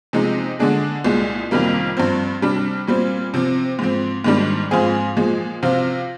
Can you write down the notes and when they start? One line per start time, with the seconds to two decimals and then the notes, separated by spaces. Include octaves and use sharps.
0.13 C3 F3 G#3 D#4
0.59 D3 G#3 D4 G#4
1.04 C2 A#2 G#3
1.51 F2 C3 D#3 G3 A#3
1.97 G2 F3 C4
2.42 C3 G3 D4
2.87 A#2 G3 C4
3.34 C3 F3 C4
3.79 G#2 F3 C4
4.24 G#2 D#3 G3 D4
4.71 G#2 F3 C4 F4 G#4
5.17 A#2 F3 G#3
5.63 C3 F3 C4 F4